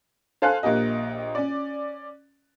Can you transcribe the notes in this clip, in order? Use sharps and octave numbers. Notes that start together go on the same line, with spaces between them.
A4 C5 F5 G#5 F#6
A#1 A#3 G4 D#5
C#4 D5